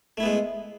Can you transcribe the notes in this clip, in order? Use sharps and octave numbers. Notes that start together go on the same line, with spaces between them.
G#3 A3 B3 E4